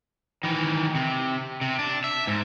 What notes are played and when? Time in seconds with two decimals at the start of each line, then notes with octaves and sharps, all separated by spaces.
0.43 D#3 E3
0.95 C3
1.61 C3
1.79 D4
2.04 E5
2.27 G#2